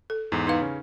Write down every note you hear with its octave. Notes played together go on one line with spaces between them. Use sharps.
A4
E2 G#2
D#4 B4 F5
C#3 C#4